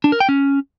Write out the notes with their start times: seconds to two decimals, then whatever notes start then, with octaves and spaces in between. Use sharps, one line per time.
0.04 D4
0.12 A#4
0.20 G5
0.29 C#4